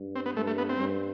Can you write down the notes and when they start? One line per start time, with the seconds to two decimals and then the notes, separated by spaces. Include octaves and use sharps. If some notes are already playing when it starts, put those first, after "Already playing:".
Already playing: G2
0.15 C4
0.26 B3
0.37 G2 A3
0.47 A3
0.58 B3
0.69 C4
0.79 G2